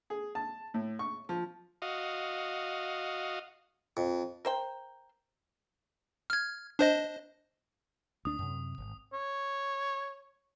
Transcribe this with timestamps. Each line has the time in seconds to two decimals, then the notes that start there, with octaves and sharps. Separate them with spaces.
0.10 G#4
0.35 A5
0.74 A2
0.99 C#6
1.29 F3
1.82 F#4 D#5 F5
3.97 F2
4.45 A#4 C5 G5
6.30 F6 G#6
6.79 D4 C5 D#5
8.25 D2 D4 D#6
8.39 F#2 C3
8.78 G#1
9.13 C#5